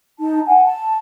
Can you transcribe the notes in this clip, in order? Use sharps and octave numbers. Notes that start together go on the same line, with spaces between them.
D#4 A5
F#5 G#5
A5